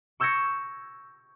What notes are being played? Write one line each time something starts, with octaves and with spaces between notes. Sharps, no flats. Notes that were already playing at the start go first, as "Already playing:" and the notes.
C#6 E6 G6 G#6 A#6 C#7